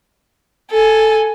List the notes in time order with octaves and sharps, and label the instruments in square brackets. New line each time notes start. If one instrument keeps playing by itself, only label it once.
[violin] A4 G#5